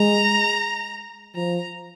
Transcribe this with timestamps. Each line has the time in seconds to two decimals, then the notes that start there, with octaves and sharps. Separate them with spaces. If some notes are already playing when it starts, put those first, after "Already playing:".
Already playing: G#3 A#5
1.35 F3 A#5